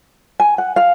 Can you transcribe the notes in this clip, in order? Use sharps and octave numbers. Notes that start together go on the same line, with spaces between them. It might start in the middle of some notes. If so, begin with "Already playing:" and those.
G#5
F#5
F5